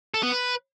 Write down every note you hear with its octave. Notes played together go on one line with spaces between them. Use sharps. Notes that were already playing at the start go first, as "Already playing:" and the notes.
A4
B3
B4